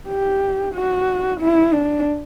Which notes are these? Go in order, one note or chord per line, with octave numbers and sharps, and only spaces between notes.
G4
F#4
E4
D4